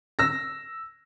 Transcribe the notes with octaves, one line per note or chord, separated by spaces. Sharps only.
E6 A#6